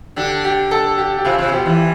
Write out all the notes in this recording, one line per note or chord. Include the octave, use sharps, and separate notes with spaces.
D3 D4 G4
G4
A4
G4
G4
C3 C4 F4
C3 C4
B2 B3 G4
E2 E3